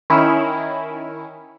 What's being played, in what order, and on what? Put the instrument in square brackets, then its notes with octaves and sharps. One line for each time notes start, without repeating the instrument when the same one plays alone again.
[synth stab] D#3 C#4 E4